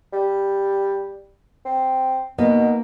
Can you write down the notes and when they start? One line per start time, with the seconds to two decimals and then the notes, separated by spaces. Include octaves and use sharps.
0.13 G3
1.65 C4
2.38 B2 A#3 B3 D#4